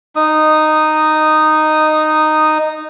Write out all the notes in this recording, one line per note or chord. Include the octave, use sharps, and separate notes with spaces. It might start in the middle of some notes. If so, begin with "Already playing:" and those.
D#4 D#6